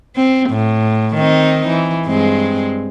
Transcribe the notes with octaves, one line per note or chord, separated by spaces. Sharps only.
C4
A2
D#3 C4 D#4
E3
G2 G#3 C4